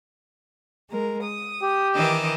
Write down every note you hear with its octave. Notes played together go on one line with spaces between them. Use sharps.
G#3 A#4
D#6
G4
D#3 E3 D#5 D6 E6